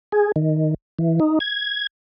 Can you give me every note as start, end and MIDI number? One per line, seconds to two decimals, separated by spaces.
0.12 0.32 68
0.36 0.74 51
0.99 1.20 52
1.20 1.39 63
1.40 1.87 92